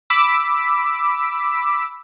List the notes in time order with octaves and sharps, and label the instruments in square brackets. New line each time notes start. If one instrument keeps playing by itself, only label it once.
[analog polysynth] B5 D6 E6 B6